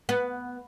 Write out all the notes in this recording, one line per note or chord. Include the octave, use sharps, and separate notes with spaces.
B3